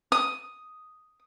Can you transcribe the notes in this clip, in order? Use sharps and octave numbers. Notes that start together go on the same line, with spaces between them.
D#6